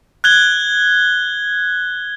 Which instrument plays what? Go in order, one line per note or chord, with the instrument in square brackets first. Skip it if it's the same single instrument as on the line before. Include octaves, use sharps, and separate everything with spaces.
[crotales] F#6 G#6 G7